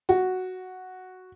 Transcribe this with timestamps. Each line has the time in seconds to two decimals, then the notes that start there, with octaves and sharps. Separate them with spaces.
0.09 F#4